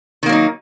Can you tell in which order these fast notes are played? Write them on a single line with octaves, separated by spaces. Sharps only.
D#3 A#3 F#3 D#4